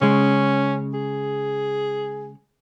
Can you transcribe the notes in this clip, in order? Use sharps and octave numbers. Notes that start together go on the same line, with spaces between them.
C#3 G#3 C#4
G#4